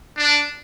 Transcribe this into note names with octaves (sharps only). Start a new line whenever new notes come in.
D4